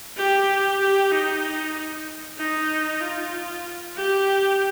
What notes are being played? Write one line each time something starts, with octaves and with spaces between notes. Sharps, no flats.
G4
G4
D#4
D#4
F4
G4